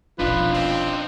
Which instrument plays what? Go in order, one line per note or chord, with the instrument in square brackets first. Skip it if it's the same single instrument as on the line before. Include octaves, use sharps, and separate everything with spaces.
[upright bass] E1 A#1 [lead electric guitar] D4 D#4 [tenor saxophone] F4 [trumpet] B4
[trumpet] C4